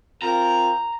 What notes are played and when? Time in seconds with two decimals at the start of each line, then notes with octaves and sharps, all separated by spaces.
0.22 C4 F4 A#4 A#5